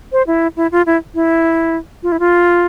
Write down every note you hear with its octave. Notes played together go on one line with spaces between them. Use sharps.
C5
E4
E4
F4
E4
E4
F4
E4
F4